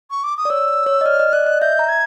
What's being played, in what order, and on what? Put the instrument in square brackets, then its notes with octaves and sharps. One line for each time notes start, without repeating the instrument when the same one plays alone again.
[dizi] C#6
D6
D#6
[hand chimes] D5
[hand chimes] C#5 [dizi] E6
[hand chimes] C#5
D#5
[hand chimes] D5 [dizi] F6
[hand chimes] D#5
[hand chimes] D5 [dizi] F#6
[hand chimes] D#5
[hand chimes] E5 [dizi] G6
[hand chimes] A#5
[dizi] G#6